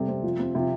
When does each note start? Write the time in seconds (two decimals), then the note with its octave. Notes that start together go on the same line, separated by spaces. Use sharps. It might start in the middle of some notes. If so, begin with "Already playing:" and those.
Already playing: C3 G3 A4
0.08 C4
0.23 F3
0.39 C4
0.55 C3 F3